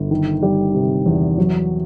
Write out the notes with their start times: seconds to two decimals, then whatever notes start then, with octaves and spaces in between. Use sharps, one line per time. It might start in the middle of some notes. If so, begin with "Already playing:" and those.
Already playing: G1
0.11 D#3
0.43 G3
0.74 C3
1.06 E2
1.38 F#3